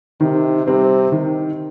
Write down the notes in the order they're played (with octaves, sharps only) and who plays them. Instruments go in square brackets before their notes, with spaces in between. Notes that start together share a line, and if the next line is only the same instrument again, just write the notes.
[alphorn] C3 [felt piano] D#3
[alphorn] C3 [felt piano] G3 C4
[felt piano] D#3